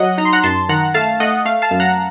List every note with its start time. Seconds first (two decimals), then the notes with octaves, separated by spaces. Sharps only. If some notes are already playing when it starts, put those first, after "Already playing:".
Already playing: F#3 D#5 F#5
0.18 D#4 A#5
0.25 C6
0.33 F#5 A#5
0.44 F#2 A5 C6
0.69 D#3 F#5 A#5
0.94 A3 F5 A5
1.20 A3 D#5 F#5
1.45 A3 F5
1.62 F5 A5
1.71 F#2
1.80 F#5 A#5